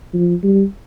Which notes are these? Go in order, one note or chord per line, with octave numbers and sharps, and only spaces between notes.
F3
G3